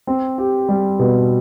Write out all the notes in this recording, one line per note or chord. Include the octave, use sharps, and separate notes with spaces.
C4
G4
G3
B2